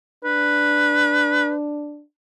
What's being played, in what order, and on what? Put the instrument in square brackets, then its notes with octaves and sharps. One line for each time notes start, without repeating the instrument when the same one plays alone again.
[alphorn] D4 [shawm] B4